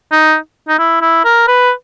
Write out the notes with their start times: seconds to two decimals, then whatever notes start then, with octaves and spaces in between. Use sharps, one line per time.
0.12 D#4
0.68 D#4
0.79 E4
1.02 E4
1.25 A#4
1.48 B4